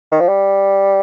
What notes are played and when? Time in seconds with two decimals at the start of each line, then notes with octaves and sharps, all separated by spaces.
0.12 D#3
0.20 F3
0.28 G3